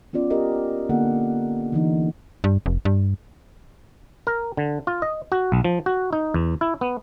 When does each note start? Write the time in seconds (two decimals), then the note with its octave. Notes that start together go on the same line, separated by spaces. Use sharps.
0.13 B3 C#4 F4 D5
0.30 G4 A#4 D#5
0.89 D3 A#3 B3 A4 F#5
1.72 D3 E3 D#4
2.44 G2
2.66 F1
2.85 G2
4.27 A#4
4.57 D3
4.87 F4
5.02 D#5
5.32 F#4
5.52 B1
5.64 F3
5.86 F#4
6.13 D#4
6.34 E2
6.61 E4
6.81 B3